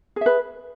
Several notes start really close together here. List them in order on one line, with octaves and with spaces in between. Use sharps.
G#4 E5 B4